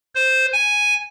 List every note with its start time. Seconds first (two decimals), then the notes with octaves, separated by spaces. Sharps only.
0.15 C5
0.53 G#5